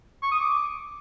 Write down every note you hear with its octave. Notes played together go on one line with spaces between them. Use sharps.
C#6
D#6
D6